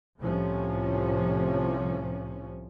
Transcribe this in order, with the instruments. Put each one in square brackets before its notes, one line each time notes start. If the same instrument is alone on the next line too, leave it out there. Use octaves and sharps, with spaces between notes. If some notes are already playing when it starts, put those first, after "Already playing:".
[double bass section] C2 A2 C3 F3 C#4